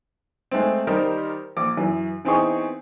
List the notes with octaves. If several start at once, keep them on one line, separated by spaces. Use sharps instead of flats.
G#3 A3 C4
D#3 G3 D#4 G4 A#4 C5
A#1 D6
F#2 E3
E3 B3 C4 D#4 G#4 C#6